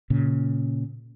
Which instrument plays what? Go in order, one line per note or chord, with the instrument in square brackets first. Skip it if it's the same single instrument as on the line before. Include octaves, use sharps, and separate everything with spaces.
[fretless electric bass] A#2 C#3